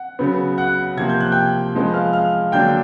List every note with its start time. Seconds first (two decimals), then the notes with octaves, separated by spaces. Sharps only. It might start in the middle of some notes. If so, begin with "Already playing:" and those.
Already playing: F#5
0.19 C#3 F#3 B3
0.58 F#5 F#6
0.97 C3 F3 A#3 G#6
1.09 G6
1.20 F#6
1.32 G5 G6
1.75 F3 G#3 B3
1.94 F5 F6
2.13 F5 F6
2.52 D3 F#3 A#3 D4 G5 G6